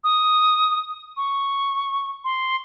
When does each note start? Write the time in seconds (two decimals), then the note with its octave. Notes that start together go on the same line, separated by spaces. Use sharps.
0.04 D#6
1.17 C#6
2.25 C6